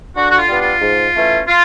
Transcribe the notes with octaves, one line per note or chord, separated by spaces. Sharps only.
D3 F#4
F#4
F4
G3 B3 D4
F4
G#2
E3 A3 C#4
F4